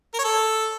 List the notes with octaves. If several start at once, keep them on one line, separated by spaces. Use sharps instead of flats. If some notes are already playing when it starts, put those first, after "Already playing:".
A#4
C#5
A4